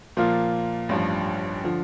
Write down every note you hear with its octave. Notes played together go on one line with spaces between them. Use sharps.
A#2 F3 A#3 F4
A1 G2 F3
D3 F3